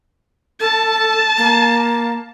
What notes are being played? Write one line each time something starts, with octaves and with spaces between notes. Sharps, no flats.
A4 A5
A#3